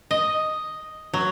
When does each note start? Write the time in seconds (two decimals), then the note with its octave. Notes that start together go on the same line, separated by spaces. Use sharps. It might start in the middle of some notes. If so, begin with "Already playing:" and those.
0.11 D#5
1.14 F#3